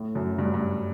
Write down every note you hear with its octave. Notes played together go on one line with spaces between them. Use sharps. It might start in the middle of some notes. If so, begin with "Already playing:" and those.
Already playing: A2
F#2
G2
G2